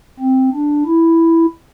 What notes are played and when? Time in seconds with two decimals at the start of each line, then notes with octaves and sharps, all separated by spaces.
0.20 C4
0.54 D4
0.86 E4